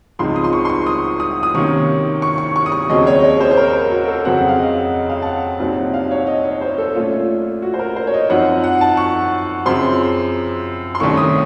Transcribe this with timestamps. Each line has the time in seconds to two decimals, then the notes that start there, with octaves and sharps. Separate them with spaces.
0.19 C#2 C#3 F3 C4 D#4 C6
0.36 D#6
0.44 C6
0.53 C#6
0.65 C6
0.70 C#6
0.87 D#6
1.20 D#6
1.43 D#6
1.54 C3 D#3 A#3 C#4 C#6
2.22 C#6
2.38 C#6
2.56 C#6
2.66 D#6
2.72 C#6
2.89 D#2 C#3 F#3 C4 D#5
3.07 C#5
3.19 D#5
3.23 C#5
3.40 C5
3.51 C5
3.57 A#4
3.91 F#4
4.08 A4
4.25 F2 C#3 F#3 C4 F#5
4.39 F#5
4.49 F5
4.59 D#5
4.92 D#5
5.09 F5
5.22 A5
5.25 F#5
5.59 C2 A#2 F#3 C4 D#4
5.94 F5
6.11 C#5
6.27 D#5
6.44 C#5
6.61 C5
6.78 A4
6.95 A#2 A3 C#4 F4
7.62 F#4
7.74 C5
7.79 A#4
7.96 C5
8.07 C#5
8.14 D#5
8.30 F#2 F3 C4 D#4 F#5
8.64 F#5
8.81 A5
8.97 C#6
9.66 F#2 C#3 F3 C4 C6
10.95 C6
11.00 C2 C3 D#3 A3 C#4 C#6
11.17 D#6